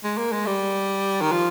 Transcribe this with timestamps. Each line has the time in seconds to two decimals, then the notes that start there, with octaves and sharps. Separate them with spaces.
0.04 G#3
0.18 A#3
0.32 G#3
0.46 G3
1.21 D#3
1.32 F3